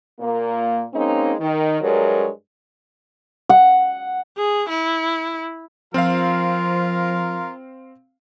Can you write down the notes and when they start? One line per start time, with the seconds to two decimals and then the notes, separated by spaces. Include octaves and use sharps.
0.20 A#2 A#3
0.94 G#3 A#3 C4 C#4 D#4
1.39 D#3
1.81 G2 F#3 G#3 A#4 C#5
3.49 F#5
4.37 G#4
4.69 E4
5.94 F3 C4 F4 A#4 F5